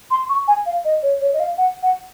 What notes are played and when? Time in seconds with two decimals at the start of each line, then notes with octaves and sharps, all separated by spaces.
0.11 C6
0.29 C#6
0.48 G#5
0.66 F5
0.85 D#5
1.03 C#5
1.21 C#5
1.34 D#5
1.40 F5
1.58 F#5
1.83 F#5